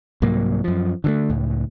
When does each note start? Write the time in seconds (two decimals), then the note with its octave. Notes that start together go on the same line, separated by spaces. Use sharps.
0.22 C2 G#2 F#3 A#3
0.64 F#2 F3
1.04 D3 E3 A3
1.30 C#2 A2